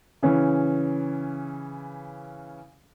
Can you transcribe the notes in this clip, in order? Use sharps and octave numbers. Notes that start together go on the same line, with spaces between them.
C#3 E3 C#4